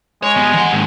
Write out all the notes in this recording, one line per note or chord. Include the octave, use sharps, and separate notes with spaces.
G#3 C#5
G3 B3
E3 F#5
D#2 G#2